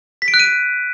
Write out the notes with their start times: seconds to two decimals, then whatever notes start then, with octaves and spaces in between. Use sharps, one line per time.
0.22 B6
0.28 D7
0.34 F#6
0.39 D#7